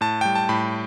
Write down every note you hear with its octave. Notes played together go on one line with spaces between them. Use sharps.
A2 A5
G3 G5
A5
A2 B5